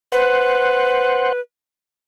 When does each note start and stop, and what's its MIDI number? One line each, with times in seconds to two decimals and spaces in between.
0.12 1.40 71
0.12 1.32 72
0.12 1.32 78